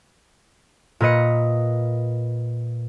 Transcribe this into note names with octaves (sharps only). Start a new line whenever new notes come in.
A#2 A#4 B4 D#5 C#7